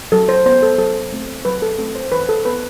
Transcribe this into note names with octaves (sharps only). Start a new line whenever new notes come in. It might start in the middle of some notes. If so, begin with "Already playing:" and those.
F#3 A4
C5
B3 C5
A4
F#3 A4
A3 C4
F#3 B4
A4
A3 C4 A4
C5
E3 B4
A4
B3 B4